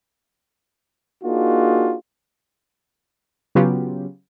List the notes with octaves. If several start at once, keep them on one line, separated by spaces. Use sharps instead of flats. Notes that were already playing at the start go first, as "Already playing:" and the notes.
A#3 D4 D#4 F4 F#4 G#4
C#3 F#3 B3 C#4 F4 G4